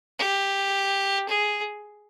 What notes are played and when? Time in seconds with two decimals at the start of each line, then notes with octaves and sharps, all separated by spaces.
0.19 G4
1.28 G#4